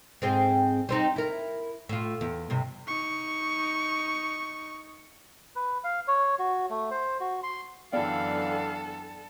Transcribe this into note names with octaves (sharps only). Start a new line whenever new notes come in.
G#2 C4 G#4
G3 C4 D#4
E4 A#4
A2 F4
E2
G2 C3
D#4 C#6
B4
F5
C#5
F#4
A3
C5
F#4
C6
F#2 D3 E3 B3 A4 D5 F5 G5